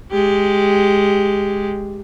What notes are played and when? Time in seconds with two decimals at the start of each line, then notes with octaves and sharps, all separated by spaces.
0.12 G#3 G4